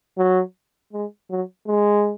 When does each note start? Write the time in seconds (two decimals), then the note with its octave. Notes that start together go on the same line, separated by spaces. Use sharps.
0.18 F#3
0.93 G#3
1.30 F#3
1.68 G#3